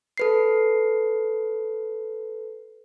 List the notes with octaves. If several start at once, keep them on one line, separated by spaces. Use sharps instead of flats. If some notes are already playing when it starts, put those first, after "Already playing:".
A4 B4 C7